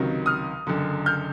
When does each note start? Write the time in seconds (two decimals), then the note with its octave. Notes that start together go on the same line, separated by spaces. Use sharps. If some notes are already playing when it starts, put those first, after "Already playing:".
Already playing: C#2 C3 D#3 F#3
0.26 D#6 F6
0.67 F#1 F#2 D3
1.06 F6 G6